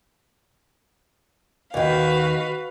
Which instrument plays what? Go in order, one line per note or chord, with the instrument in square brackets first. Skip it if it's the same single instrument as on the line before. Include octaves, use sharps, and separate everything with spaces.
[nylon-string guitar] D#2 D#3 [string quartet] F#4 B4 F5